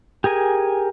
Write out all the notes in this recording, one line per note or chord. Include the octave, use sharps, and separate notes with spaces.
G4 G#4 A#4 G#5